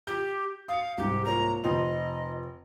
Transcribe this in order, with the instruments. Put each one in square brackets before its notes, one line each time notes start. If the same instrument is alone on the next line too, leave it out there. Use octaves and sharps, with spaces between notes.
[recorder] G4 [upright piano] G6
[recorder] F5 [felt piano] D#6 C#7
[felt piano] C2 G#2 [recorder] G4
[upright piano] A#3 F4 C#5 [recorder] A#5
[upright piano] F1 C6 F7 [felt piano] C4 [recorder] D#5